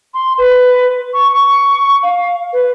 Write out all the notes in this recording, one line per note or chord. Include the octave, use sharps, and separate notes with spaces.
C6
B4
C#6
C#6
F5
B4